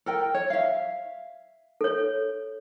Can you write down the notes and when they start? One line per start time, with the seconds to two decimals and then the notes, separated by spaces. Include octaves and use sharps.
0.06 A4 A#4 G5
0.34 C#5
0.50 E5 F5
1.81 A4 C#5